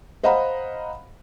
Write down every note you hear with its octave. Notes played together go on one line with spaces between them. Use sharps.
C5 D#5 F5 F#5 A#5 B5